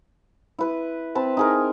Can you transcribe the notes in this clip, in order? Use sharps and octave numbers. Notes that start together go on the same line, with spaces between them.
E4 B4
C4 B4 A5
D#4 G#4 A#4